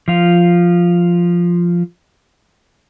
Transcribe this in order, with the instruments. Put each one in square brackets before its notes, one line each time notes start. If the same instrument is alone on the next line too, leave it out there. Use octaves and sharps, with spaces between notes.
[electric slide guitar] F3 F4